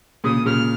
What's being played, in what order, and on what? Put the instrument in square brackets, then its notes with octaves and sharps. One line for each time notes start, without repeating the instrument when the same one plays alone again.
[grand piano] A#2 C#3 [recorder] D#6
[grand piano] A#2 C#3 [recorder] F6